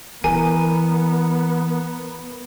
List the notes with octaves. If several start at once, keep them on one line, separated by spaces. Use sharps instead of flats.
E3 B3 A#4 G#5